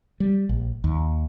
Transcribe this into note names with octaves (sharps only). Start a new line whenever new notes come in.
G3
A#1
D#2